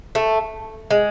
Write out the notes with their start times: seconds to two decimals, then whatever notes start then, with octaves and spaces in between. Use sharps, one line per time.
0.15 A3
0.91 G#3